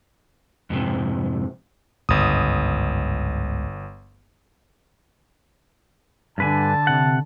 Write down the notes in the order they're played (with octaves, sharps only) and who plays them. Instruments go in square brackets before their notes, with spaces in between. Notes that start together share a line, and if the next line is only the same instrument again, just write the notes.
[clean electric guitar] F2 G#2 C3
[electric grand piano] G1 D#6 [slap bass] C#2 G#2
[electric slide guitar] G2 B4 G#5 [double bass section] D3 [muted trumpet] A5
[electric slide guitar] C3 F#5